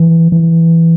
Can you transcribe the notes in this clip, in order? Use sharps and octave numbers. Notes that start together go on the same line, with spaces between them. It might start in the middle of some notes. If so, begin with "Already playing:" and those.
Already playing: E3
E3